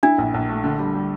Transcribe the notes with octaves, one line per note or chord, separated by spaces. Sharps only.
D4 E4
A#1
A#1
A3
D3
G3
G3